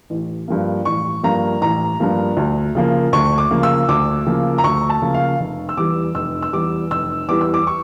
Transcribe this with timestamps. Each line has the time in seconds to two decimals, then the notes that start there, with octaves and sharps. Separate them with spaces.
0.10 A1
0.48 G2 F3 A#3
0.85 A1 C#6
1.23 G2 F3 A#3 A#5
1.61 A1 A#5
2.00 G2 F3 A#3
2.37 D2
2.75 C#3 F3 A#3
3.13 D2 C#6
3.38 D6
3.51 C#3 F3 A#3
3.63 E6
3.88 D2 D6
4.26 C#3 F3 A#3
4.58 A#5
4.64 D2 C#6
4.89 A5
5.02 C#3 F3 A#3
5.14 F5
5.39 F1
5.69 E6
5.77 E2 E3 G3 D6
6.15 F1 E6
6.42 E6
6.53 E2 E3 G3 D6
6.91 F1 E6
7.28 E2 E3 G3 D6
7.41 E6
7.54 D6
7.67 C#6